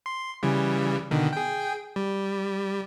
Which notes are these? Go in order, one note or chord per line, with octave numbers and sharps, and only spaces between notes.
C6
C#3 E3 G3
B2 D3 D#3
G#4 G5
G3